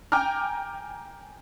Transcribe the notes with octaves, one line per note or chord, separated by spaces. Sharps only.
G5 G#5 A#5 D6 F6